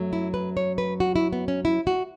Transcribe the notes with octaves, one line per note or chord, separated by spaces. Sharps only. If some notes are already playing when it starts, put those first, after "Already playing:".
Already playing: F#2 F#3 A3
E4
B4
C#5
B4
F#4
E4
B3
C#4
E4
F#4